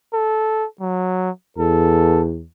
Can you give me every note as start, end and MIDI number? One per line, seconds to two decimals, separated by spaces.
0.14 0.66 69
0.81 1.31 54
1.58 2.44 40
1.58 2.22 69